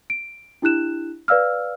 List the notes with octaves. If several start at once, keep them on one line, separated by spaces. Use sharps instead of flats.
D7
D4 E4 G4 F#6 E7
B4 D5 F5 E6 F6